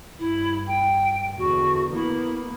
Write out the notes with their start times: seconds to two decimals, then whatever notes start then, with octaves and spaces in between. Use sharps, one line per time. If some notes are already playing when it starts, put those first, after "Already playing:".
0.19 G2 E4
0.67 G5
1.37 E2 D3 F#4
1.93 A#3 B3 E4